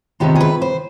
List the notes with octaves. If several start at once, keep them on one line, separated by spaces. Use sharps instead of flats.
C3 D#3 B3 F4 G4
G#4
B4
C5